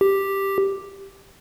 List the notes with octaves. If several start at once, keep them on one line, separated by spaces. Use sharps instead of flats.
G4